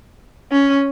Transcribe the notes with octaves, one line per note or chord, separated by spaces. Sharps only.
C#4